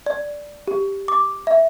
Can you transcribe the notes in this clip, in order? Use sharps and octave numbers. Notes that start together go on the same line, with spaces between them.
D5
G4
D6
E5